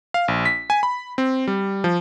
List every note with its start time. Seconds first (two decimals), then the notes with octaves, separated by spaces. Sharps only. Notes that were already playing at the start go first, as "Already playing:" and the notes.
0.14 F5
0.28 A#1
0.45 B6
0.70 G#5
0.83 B5
1.18 C4
1.47 G3
1.84 F3